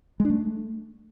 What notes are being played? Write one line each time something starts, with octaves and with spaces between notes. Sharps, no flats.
G#3
D4
A3